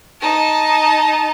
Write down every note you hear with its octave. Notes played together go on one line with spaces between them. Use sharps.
D#4 A5